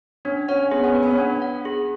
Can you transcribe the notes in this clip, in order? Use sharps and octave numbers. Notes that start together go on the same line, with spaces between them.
C#4 D4
C#4 F#5
C#4
B3 G#4
B3
C#4
B4
B3
C#4
B3 D4
F#5
G#4